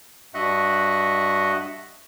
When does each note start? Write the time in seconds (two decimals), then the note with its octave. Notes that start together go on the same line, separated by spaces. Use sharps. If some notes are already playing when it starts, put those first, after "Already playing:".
0.34 G2 F#4 D#5 E5 F#5 F#6